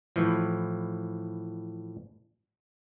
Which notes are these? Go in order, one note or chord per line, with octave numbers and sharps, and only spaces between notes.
A2 E3 F3